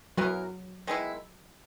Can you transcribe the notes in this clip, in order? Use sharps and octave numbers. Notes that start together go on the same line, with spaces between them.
E3 F#3 B3 E4 A#4
D#3 G#3 B3 E4